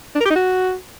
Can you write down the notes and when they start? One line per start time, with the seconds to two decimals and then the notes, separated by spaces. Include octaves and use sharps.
0.15 D4
0.20 A#4
0.25 G4
0.30 D#4
0.35 F#4